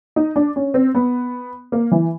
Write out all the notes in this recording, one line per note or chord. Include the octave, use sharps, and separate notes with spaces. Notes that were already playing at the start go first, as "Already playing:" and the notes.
D#4
D4
C#4
C4
B3
A#3
E3